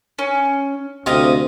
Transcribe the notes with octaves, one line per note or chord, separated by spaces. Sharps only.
C#4
D2 C3 D#5 F5 D#6